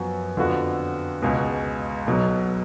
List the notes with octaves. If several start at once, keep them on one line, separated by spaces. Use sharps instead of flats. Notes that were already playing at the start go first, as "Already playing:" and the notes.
Already playing: F#2 F3 B3 F#4
F2 D3 F3 B3 F#4
C#2 B2 G#3
B1 B2 F#3